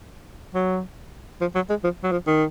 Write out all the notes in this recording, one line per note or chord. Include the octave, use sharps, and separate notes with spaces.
F#3
F3
F#3
G#3
F3
F#3
F3
D#3